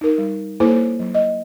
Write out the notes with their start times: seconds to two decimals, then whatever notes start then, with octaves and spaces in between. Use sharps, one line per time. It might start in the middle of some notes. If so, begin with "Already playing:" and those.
0.01 D#4 A#4
0.18 G3
0.60 A#3 E4 A4 C5 C#5
0.99 F#3
1.14 D#5